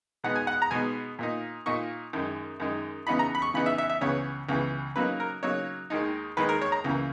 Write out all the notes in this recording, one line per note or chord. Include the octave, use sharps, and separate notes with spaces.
B2 G#3 B3 D#4 F#5
G#5
F#5
A#5
B2 G#3 B3 D#4 G#5
A#2 A#3 D#4
A#2 A#3 D#4 C#6
F#2 D#3 G#3 D#4
F#2 D#3 G#3 D#4
C#3 E3 B3 D#4 B5
A#5
B5
C#6
C#3 E3 B3 D#4 B5
E5
E5
E5
C#2 C#3 E3 B3 C#5
C#2 C#3 E3 B3
C#3 F#3 A#3 D#4 B4
A#4
C#3 F#3 A#3 D#4 C#5
D#2 D#3 G#3 D#4
D#2 D#3 G#3 D#4 B4
A#4
C#5
A#5
C#2 C#3 E3 A#3